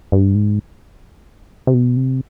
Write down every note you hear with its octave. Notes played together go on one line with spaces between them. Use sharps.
G2
G#2
C3
B2
C3